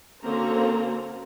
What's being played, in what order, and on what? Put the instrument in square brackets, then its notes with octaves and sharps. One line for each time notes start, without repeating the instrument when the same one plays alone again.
[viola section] D3 A#3 C4 C#4 F#4 A#5